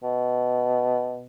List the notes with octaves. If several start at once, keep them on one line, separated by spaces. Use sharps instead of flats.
B2